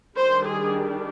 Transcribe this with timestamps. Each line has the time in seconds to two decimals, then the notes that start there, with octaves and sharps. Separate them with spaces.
0.17 D#3 G3 D4 C5
0.46 G#4